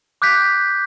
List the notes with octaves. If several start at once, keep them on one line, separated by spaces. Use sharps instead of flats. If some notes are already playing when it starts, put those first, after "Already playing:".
D6 F#6 G6 B6